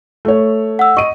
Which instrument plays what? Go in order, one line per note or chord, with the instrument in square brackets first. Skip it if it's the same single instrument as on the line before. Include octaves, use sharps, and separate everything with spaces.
[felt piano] A3 C#5
[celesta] F#5 E6
[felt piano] D#5 D#7 [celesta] C#6